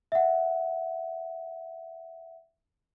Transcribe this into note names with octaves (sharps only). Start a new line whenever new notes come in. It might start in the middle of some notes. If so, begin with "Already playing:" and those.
E5 F#5